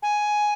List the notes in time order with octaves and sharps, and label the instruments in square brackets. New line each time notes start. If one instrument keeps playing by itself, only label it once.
[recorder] G#5